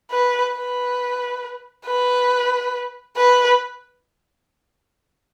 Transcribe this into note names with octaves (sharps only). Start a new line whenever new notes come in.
B4
B4
B4
B4